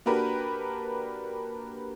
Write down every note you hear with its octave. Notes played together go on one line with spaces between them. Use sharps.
A#3 D4 F#4 G4 A#4 B4